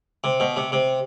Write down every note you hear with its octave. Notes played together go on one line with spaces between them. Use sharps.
C3
B2
C3
C3